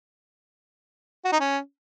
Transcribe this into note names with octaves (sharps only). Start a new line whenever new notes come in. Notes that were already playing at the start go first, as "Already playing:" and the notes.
F#4
D#4
C#4